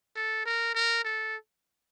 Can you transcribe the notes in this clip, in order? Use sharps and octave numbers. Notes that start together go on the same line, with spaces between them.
A4
A#4
A#4
A4